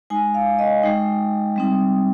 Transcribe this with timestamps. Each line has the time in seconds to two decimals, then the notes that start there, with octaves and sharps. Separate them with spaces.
0.10 G#3 D#4 G#5
0.34 F5
0.59 D#5
0.83 G#3 D#4 G5
1.56 G3 C4 D#4